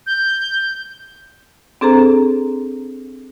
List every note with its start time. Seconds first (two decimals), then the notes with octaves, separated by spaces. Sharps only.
0.07 G6
1.81 C4 D4 G#4 A4 C5 A#5